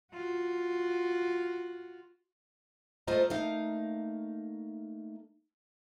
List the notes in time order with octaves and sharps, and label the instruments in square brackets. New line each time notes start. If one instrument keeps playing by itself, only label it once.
[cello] F4 F#4
[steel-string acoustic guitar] G#2 A3 F4 C5 D#5 A#5
A3 A#3 D#4 F5